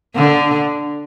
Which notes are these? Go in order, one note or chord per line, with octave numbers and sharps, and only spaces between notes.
D3